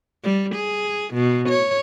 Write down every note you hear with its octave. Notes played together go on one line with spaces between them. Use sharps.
G3
G#4
B2
C#5